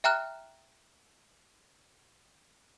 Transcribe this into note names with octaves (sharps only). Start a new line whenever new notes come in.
E5 G5 A#5 F6 F#6